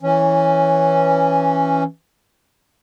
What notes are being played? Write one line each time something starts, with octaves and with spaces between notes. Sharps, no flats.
E3 C#4